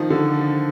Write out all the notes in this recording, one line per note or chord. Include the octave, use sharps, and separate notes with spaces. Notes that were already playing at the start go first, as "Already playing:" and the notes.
Already playing: D#3 F3
D3